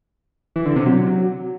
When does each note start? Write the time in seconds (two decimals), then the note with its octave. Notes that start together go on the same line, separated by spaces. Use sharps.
0.56 E3
0.66 D3
0.76 C3
0.86 F#3